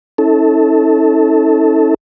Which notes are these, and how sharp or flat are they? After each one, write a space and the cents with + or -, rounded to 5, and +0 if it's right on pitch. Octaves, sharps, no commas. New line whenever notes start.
C#4 -15 E4 -45 A4 +0